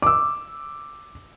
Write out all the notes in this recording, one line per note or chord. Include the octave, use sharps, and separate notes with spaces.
D6 E6